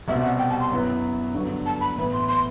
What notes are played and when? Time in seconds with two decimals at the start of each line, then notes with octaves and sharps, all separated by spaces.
0.08 C2 B2 G3 C4 E5
0.23 F#5
0.39 G5
0.50 A5
0.60 C6
0.71 F#2 F#3 B3 E4 B4
1.34 G2 D3 F#3 B3 F#4
1.66 A5
1.81 B5
1.97 A2 E3 B3 E4 B4 B5
2.13 C6
2.29 C6